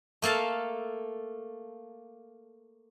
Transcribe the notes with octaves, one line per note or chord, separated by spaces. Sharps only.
A3 A#3 A4 F5 A5